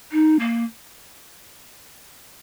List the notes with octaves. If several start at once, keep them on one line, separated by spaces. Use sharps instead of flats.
D#4
A#3